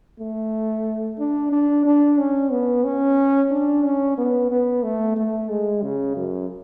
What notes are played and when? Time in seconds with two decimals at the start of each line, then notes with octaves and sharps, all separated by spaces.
0.20 A3
1.19 D4
1.52 D4
1.85 D4
2.18 C#4
2.52 B3
2.84 C#4
3.51 D4
3.84 C#4
4.18 B3
4.51 B3
4.83 A3
5.17 A3
5.50 G#3
5.83 C#3
6.16 F#2